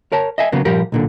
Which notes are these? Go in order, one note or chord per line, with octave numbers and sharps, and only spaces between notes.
A#4 C#5 A5
D#5 E5 G#5
C#3 F#3 A#3 B3
A#2 F3 G3 G4 A#4
B1 A#2 D3